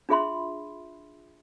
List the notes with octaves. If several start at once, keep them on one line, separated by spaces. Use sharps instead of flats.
D4 F4 G#4 E5 B5 C6